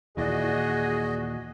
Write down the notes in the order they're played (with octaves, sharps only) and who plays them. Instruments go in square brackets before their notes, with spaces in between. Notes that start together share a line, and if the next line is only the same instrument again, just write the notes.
[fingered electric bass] D#2 A#2 E3 [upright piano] E4 D5 [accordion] F#4 D#5 [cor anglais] G#4